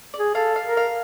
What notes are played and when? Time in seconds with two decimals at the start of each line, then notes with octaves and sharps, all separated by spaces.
0.14 D5
0.19 G#4
0.35 A4 F5
0.56 F5
0.66 A#4
0.77 F5